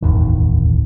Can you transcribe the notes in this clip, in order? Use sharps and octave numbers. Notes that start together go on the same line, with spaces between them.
D1 G1 E2 D#3